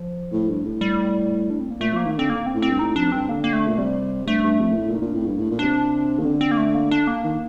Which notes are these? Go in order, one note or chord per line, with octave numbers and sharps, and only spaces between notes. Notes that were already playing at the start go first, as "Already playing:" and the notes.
Already playing: F3
A2
G2
A2
G3
D4
C4
A#3
A#2 A3
F3 A#3
D#3
D3 C4
A#3
C4
A2
C4
G2
A2 D#4
F2 D4
G2 C4
D3 A#3
A#3
A3
A#2
C3 G3
G2 A3
G2
F2
A#2
A2
A#2
D#4
A#2 D4
A2 C4
G2 A#3
A2 D4
A#2
C3 D4
D#3 A#3
D3 C4
C4
A#3
A3
A#3
D4
A#3
D#3